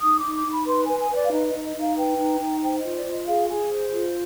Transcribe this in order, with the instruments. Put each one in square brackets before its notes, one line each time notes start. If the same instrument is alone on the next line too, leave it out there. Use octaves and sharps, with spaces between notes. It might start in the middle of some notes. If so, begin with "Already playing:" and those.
[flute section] D#4 D#6
D6
D#4
D6
D#4
B5
B4 C6
B4 G#5
G#5
B4 D5
F5
D#4 D#5
D#5
D#4
D#5
D#4 F5
B4 G5
D#4
D#4
C5 G5
F4 D#5
D5
F4 D#5
G#4 F5
G#4 G#5
C5
F4